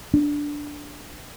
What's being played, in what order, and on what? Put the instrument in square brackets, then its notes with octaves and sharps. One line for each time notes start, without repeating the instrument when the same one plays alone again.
[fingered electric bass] D4